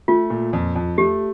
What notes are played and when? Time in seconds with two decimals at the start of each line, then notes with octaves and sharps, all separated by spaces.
0.08 A3 F4
0.30 A#2
0.53 F2
0.76 F2
0.98 A3 G4